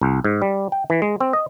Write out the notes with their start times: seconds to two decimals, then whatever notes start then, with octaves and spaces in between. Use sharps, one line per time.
0.02 C2
0.25 G#2
0.42 G3
0.72 G5
0.90 E3
1.02 G#3
1.21 C4
1.33 D#5